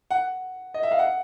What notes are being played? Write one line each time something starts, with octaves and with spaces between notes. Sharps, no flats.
F#5
D#5
E5
F5
F#5